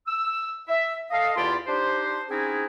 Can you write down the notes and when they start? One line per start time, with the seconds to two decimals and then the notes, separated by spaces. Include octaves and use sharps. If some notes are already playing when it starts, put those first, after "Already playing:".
0.07 E6
0.68 E5
1.11 A4 D#5 F5
1.36 E2 E4 F4 G4 D5 C6
1.67 D4 D#4 G4 C5
2.29 C4 C#4 D#4 E4 F#4 G#4